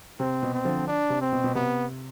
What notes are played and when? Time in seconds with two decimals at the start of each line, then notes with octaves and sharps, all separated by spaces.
0.20 C3 C4
0.43 B2
0.54 C4
0.65 D3 F3
0.87 D4
1.10 C3
1.21 C4
1.32 B2
1.44 B2
1.55 C3 B3